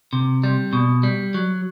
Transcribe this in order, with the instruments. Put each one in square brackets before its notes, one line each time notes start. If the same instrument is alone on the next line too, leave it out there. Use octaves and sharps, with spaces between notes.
[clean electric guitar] C3
G3
B2
G3
F#3